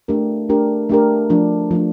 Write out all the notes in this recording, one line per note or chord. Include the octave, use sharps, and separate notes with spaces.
A3 D4 G4 A#4
A3 D4 G4 A#4
A3 D4 G4 A#4
F3 A3 D4
F3 A3 D4